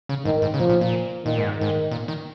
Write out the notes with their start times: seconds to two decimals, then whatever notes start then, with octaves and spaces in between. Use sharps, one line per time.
0.09 C#3
0.25 G#2 D#3
0.42 G#2
0.54 C#3
0.59 A#2 F3
0.69 A#2
0.81 A#2
1.25 A#2 D#3
1.38 G#2
1.58 G#2 D#3
1.91 A#2
2.08 D#3